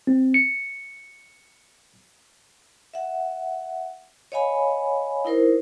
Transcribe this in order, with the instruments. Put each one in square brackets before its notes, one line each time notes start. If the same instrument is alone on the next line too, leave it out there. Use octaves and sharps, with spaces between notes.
[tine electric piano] C4
C#7
[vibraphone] E5 F#5
C#5 D#5 F5 G#5 B5
D#4 E4 A#4 C5